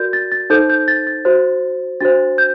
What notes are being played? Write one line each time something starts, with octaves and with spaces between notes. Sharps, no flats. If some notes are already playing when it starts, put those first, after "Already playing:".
Already playing: F#4 A#4 D5 G6
A6
A6
D#4 A4 C5 G6
G6
A6
A6
F#4 C5
D4 F#4 C5 A6
G6